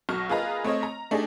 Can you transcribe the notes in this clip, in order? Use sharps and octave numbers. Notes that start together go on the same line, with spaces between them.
B1 F#3 C#6 F6 A#6
A#3 F4 G#4 B4 D#5 A#5
A3 C4 C#5 D#5
A#5
A3 D4 D#4 G4 G#4